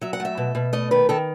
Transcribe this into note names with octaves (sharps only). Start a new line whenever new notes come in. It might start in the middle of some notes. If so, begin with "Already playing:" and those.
F#3 E5
F#5
A3 E5
B2
B2
A3 D#5
D#3 B4
D#3 A4